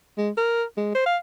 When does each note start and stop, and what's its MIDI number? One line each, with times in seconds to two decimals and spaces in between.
0.18 0.30 56
0.37 0.63 70
0.77 0.92 56
0.94 1.02 72
1.06 1.17 77